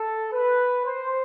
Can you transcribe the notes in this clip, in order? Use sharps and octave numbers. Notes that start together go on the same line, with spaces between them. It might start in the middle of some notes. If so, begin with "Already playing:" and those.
Already playing: A4
B4
C5